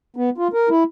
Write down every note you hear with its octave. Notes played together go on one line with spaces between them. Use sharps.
B3
F4
A#4
E4